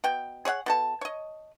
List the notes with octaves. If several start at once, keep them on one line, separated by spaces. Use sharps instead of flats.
B2 G5
G#4 C#5 E5 F#5
B2 A4 A5
C#5 D#5